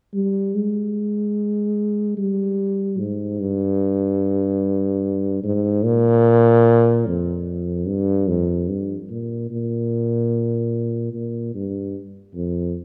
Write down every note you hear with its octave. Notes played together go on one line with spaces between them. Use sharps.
G3
G#3
G3
G#2
G2
G#2
A#2
F2
G2
F2
G2
A#2
A#2
A#2
G2
F2